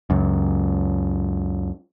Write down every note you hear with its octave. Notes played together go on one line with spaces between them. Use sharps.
C#2 F#2